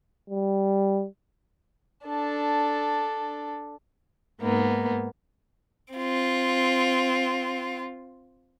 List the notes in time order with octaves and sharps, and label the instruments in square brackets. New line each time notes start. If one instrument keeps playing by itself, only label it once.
[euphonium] G3
[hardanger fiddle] D4 A4
[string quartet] G#2 A#3 B3 D#4
[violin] C4 F4